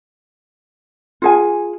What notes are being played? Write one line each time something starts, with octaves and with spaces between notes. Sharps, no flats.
F4 G#4 G#5